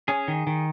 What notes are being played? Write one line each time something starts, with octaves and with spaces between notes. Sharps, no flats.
C#4 G#4
D#3
D#3